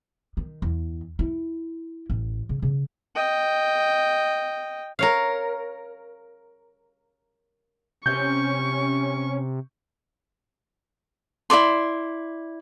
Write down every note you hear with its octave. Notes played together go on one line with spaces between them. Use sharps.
D#3
E2
E4
A1
C#3
C#3
D#5 G5
A#4 C#5 F5
C3 C#4 C#6 G6
E4 A4 D5 C6